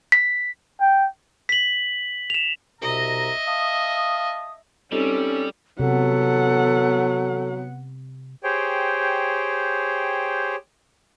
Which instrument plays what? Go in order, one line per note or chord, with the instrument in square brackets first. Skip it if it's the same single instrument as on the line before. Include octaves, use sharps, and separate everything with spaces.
[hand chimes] B6
[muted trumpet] G5
[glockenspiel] B6 F#7
E7 F7
[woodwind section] C2 B2 A#5 [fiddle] D#5 E5
[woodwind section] F5 A5 D#6
[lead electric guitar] G3 [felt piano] C4 D#4 G4 [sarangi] C#4 [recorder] A4
[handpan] C3 [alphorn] F#3 [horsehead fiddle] B3 F#5 [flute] A4
[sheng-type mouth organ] G4 G#4 C5 C#5 G5